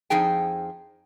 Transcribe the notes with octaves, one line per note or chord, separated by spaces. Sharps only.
F2 F3 D#4 G#4 G5